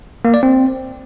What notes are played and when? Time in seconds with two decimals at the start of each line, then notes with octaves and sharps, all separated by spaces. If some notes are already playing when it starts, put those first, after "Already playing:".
0.25 A#3
0.34 D5
0.43 C4